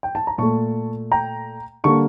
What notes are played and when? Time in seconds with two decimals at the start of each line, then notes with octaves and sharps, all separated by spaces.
0.03 G5
0.15 A5
0.27 A#5
0.38 A#2 A3 A5 C#6
1.11 G5 A#5
1.84 D3 G3 A#3 A5 C#6